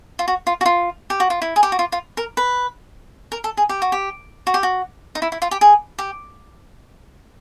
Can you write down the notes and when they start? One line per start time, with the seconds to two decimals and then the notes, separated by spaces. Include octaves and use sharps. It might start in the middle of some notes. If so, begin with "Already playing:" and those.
0.19 F4
0.28 F#4
0.47 F4
0.61 F#4
0.66 F4
1.10 G4
1.20 F#4
1.30 F4
1.42 E4
1.56 G#4
1.63 G4
1.72 F#4
1.79 F4
1.92 F4
2.17 A#4
2.37 B4
3.32 A#4
3.44 A4
3.57 G#4
3.69 G4
3.82 F#4
3.92 G4
4.47 F#4
4.54 G4
4.63 F#4
5.15 D#4
5.22 E4
5.32 E4
5.42 F4
5.51 G4
5.61 G#4
5.98 G4